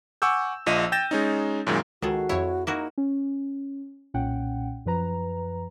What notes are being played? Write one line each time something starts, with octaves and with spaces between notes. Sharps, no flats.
F#5 G#5 C#6 D6 E6 G6
A#1 F3 D#5 D#7
G5 G6 A6 A#6 E7
G#3 C#4 D#4
F#2 A#2 D#3 G#3
C#2 D#3 F#4 G#4 A4
F2 E4 C#5
A#3 D#4 E4 F#4
C#4
B1 A#2 C#4 F#5 G5
F#2 F3 B4 A#5